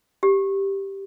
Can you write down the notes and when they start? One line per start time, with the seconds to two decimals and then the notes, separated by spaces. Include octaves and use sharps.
0.23 G4